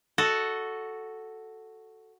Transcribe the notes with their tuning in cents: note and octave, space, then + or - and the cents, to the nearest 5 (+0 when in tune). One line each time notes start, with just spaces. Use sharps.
F#4 +0 A4 +0 D#5 +0